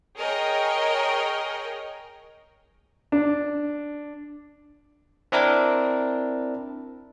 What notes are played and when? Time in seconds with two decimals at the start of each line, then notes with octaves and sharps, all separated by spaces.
0.17 G#4 A#4 C#5 D#5 G5
3.12 D4
5.32 C4 D4 E4 A#4